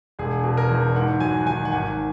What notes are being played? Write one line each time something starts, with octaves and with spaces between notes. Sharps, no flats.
E1 G#4
B2 G#4
A#4
E2
G#2 F#5
F#3 G#5
D#3 G#5
F#5
G#1 G#5